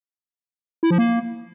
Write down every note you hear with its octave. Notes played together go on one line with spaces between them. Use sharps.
E4
F3
A#3